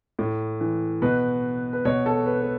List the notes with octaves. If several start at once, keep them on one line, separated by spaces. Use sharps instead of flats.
A2
E3
B2 B4
B4
B2 C#5
A4
B4
B4